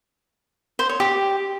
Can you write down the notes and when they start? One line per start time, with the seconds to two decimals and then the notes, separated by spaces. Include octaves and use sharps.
0.79 C5
0.89 C#5
1.00 G4